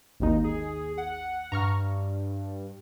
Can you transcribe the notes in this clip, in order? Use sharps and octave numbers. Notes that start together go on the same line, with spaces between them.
G#1 D#2 D#4
G#4
F#5
G2 A#5 C#6 F6